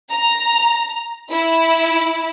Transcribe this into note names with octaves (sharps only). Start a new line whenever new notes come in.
A#5
E4